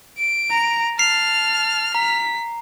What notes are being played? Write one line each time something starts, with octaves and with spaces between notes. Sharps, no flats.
D7
A#5
A5 F6 C7
A#5 B6